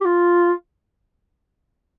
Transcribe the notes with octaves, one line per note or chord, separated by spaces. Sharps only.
G4
F4